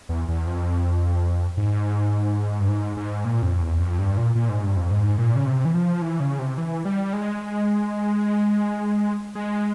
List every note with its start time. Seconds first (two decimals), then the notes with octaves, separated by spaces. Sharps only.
0.09 E2
0.28 E2
0.47 F2
1.57 G#2
2.60 G2
2.68 G#2
2.97 G#2
3.25 A#2
3.42 F2
3.61 E2
3.80 F2
3.99 G2
4.17 A#2
4.35 A#2
4.49 G#2
4.64 G2
4.77 F2
4.91 G#2
5.18 A#2
5.36 C#3
5.46 C3
5.65 E3
5.74 F3
6.02 E3
6.20 C#3
6.39 C3
6.58 E3
6.85 G3
7.13 G#3
9.35 G#3